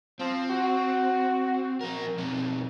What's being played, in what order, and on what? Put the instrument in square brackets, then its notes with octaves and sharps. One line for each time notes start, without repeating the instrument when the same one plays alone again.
[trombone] F3 [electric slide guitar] C4
[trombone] F#4
[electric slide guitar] F3 A#4
B2 F3 C4